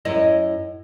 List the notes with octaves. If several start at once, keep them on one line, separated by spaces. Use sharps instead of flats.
F#2 E4 D#5